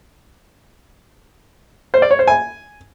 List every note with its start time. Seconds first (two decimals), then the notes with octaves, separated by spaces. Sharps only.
1.94 C5
2.02 D5
2.11 C#5
2.19 C5
2.28 G#5